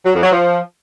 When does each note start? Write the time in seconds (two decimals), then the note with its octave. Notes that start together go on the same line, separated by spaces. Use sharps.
0.05 F#3
0.14 F2
0.23 F#3
0.31 F3